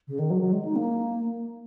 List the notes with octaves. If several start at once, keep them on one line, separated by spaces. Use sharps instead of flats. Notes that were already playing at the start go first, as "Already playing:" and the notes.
C#3
D#3
F#3
F#3
G#3
D#4
A#3